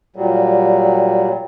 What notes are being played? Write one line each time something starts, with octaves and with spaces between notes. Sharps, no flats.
A#2 F#3 G3